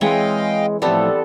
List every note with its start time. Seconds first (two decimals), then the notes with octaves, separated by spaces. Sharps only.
0.01 E3 G#3 C4 C#5 D#5 F5 G5
0.82 A2 F3 G3 A3 B3 C4 A4